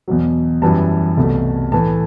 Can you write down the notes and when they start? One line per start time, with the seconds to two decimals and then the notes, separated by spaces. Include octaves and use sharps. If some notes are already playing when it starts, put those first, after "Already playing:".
0.08 E2 B2 F#3
0.62 F#2 E3 G3 A5
1.17 C2 B2 A3
1.72 A2 E3 A3 A5